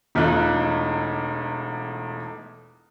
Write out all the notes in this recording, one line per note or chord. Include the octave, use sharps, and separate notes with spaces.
E1 E2 A3 D#4 F4 F#6